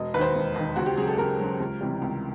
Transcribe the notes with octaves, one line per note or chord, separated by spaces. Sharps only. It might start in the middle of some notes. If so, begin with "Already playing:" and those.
Already playing: E1 D#5
D#2 D#3 B4 C5
E1
D#2 D#3
C#2 F#4
G4
C#3 F#3 G#4
A4
C#2 A#4
C#3 F#3
C#2
C3 E3 G3
C#2